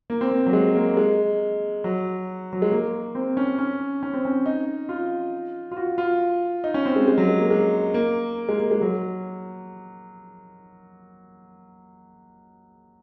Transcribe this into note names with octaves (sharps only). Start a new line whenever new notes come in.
A#3
C4
A#3
F#3
G#3
A#3
G#3
F#3
F#3
G#3
A#3
C4
C#4
C#4
C#4
C4
C#4
D#4
F4
F4
F#4
F4
D#4
C#4
C4
G#3
G#3
F#3
G#3
A#3
G#3
A#3
G#3
A#3
G#3
F#3